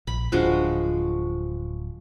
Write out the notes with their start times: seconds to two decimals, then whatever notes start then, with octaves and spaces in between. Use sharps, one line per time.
0.07 A#1 B5
0.32 D1 F3 G#3 D4 F#4